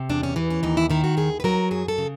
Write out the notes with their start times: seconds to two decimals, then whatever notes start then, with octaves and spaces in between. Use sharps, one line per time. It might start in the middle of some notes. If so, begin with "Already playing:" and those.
Already playing: C3
0.09 E2 D4
0.23 C#4
0.36 E3 B3
0.50 C#4
0.63 D#2 D#4
0.77 E4
0.90 D#3 E4
1.04 F#4
1.17 D#2 G#4
1.40 B4
1.44 F#3 A#4
1.71 F#2 G#4
1.88 A4
1.98 C#3